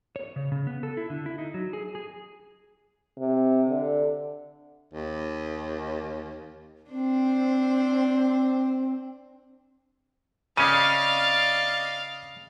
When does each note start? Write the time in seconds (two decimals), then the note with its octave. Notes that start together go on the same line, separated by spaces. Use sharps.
0.16 C#5
0.36 C#3
0.52 C#3
0.67 B3
0.83 A4
0.97 E4
1.10 D3
1.26 E4
1.38 D#4
1.54 F#3
1.73 G#4
1.95 G#4
3.18 C3
3.68 D3
4.93 D#2
6.90 C4 D4 C5
10.57 C#3 C#4 D5 D#5 F5 D6 F6 D#7